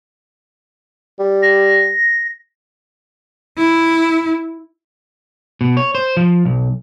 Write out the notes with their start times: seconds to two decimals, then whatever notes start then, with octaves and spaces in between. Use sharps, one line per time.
1.19 G3
1.42 A#6
3.58 E4
5.61 B2
5.77 C#5
5.95 C5
6.17 F3
6.45 B1